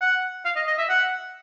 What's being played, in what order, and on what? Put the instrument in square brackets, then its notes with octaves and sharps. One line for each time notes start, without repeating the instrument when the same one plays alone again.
[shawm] F#5
F5
D#5
D#5
E5
F#5